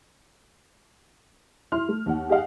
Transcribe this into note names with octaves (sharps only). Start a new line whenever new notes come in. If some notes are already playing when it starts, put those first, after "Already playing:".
E4 C6 F6
A3
D#2 F#5
G4 G#4 D#5 F5 F#5